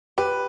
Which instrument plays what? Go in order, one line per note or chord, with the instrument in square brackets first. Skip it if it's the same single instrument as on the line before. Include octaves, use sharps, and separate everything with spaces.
[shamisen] G4 [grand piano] B4